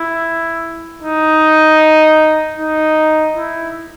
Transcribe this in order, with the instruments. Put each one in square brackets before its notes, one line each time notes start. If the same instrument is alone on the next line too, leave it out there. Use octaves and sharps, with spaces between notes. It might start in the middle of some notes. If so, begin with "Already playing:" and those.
Already playing: [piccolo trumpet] E4
D#4
D#4
E4